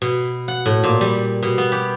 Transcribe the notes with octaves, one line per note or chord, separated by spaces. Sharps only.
B2
F#5
A2
A#2
G3
B2
B3
G4